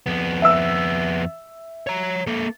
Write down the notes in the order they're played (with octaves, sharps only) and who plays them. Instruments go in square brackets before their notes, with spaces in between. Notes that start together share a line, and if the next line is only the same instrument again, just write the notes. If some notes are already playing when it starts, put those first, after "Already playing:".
[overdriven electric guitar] F2 B3
[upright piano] E5 E6
[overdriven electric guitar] C#5 A#5
A#3 A4